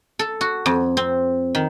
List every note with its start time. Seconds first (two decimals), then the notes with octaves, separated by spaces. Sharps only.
0.19 A4
0.41 F#4
0.66 F2
0.97 C4
1.55 D#3